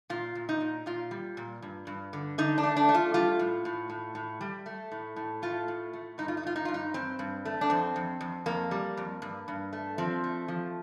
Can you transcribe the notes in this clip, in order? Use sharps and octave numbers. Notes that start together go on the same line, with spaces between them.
A#2 F4
A#2
D#4
A#2
A#2 F4
G3
A#2
G2
G2
D3
D3 D#4
D4
A3
D4
A3
F4
G3 F4
A2
A2
A2
A2
G3
A3
A2
A2
A3 F4
A2
A3
G2 D#4
F4
D#4
G2 F4
D#4
G2 F4
D#4
G2 C4
G2
A3
D4
F2 C4
F2
F2
F2 A#3
G3
F2
G2
G2
A3
F3 C4
A3
F3